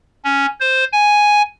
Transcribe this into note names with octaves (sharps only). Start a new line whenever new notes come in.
C#4
C5
G#5